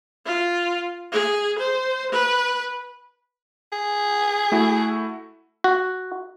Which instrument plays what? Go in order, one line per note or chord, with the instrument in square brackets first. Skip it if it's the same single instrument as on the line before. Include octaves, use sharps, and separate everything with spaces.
[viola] F4
G#4
C5
B4
[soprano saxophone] G#4
[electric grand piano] A3 E4 F#4
[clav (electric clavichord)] F#4